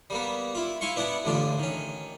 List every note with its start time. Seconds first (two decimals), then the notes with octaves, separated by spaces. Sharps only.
0.10 G3 A#3 B3
0.55 E4 F4
0.81 E4 F5 G#5 C6 C#6
0.96 B3 D4 E4 F#5 A5
1.25 A1 D3 D4 F4
1.59 D#3 C#4